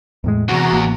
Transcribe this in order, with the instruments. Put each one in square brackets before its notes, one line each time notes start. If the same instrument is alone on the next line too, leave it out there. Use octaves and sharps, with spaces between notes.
[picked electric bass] E2 A2 G#3
[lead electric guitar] E2 [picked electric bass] C3 [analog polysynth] F#4 A#5
[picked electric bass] A1 A#3